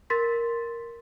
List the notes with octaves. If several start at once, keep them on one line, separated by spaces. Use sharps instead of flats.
A#4 C6 A6 B6